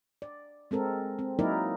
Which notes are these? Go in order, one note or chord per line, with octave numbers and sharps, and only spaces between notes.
D5
G#3 C4 A4 A#4
C4
F#3 A#3 D#4 E4 A#4 D5